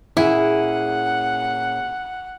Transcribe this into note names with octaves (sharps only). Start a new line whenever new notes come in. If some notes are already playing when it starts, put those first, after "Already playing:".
A#2 C#4 E4 G#4 F#5